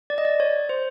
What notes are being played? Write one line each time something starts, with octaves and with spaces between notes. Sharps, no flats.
D5
D#5
D5
C#5
C5